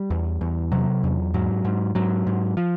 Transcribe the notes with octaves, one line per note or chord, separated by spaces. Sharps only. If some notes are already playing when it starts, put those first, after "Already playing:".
Already playing: G3
E2
E2
C3 F#3
E2
G#2 F#3
G#2
G#2 F#3
G#2
F3